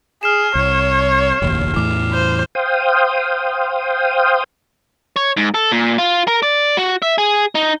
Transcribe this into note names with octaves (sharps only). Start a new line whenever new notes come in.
G#4 F6 C7 E7
C2 C#5
F1 A#1 D#2
E2 A2 E3 D6
C5
C5 F5 G5 D#6
C#5
G#2
A4
A#2
F4
A#4
D5
F#4
E5
G#4
D#4